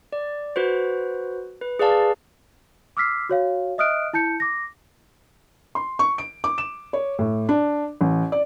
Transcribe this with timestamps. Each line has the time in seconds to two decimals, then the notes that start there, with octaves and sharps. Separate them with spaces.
0.13 D5
0.56 F#4 B4 C5
1.61 B4
1.79 G#4 B4 D5 F5 A5
2.97 D6 E6 F6 B6 C7
3.29 F#4 C#5 F5
3.78 D#5 E5 D#6 F6 F#6 D7
4.13 E4 A5 G6 C#7
4.40 D6 A#6
5.75 C6
5.99 C#6
6.18 D7
6.44 D6
6.58 E7
6.93 C#5
7.19 A2
7.49 D4
8.01 A1
8.32 D5